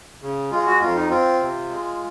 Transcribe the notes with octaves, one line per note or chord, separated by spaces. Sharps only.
C#3
G#3 F4
F#4
F2 F4
D#4
C4 F4
C3
G#3